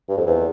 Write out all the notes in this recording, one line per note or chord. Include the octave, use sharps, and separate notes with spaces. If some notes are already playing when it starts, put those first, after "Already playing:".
G2
F2
E2